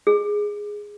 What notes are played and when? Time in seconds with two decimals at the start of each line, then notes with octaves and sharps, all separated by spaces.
0.07 G#4